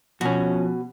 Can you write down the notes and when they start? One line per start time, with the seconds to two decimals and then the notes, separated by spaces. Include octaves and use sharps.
0.21 B2 F3 C#4 F#4